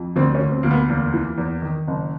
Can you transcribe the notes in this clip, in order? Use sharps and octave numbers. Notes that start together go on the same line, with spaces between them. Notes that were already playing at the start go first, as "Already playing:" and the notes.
Already playing: F2
D2 C4
C#4
D2
C4
D2 A#3
B3
E2 A#3
E3
E2
D#3
F#1